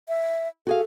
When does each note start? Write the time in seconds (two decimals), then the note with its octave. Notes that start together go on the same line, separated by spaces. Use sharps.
0.08 E5
0.67 F#4 G#4 A4 F5